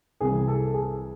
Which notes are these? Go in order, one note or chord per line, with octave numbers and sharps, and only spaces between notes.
C2 C3 E3 G#4
A4
G#4